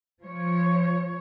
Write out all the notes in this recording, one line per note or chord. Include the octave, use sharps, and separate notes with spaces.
F3 C#5